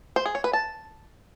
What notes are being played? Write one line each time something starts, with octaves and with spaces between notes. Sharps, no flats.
C5
G#4
C#5
B4
A5